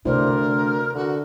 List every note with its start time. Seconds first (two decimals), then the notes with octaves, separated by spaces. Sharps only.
0.05 D2 C3 E4 A#4 C5 D5
0.95 D3 F#4